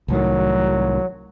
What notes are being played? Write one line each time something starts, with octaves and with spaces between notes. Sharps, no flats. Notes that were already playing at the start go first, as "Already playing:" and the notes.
C2 A2 D#3 F#3